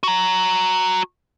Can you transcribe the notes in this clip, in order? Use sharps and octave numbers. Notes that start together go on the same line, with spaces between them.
F#4 A#5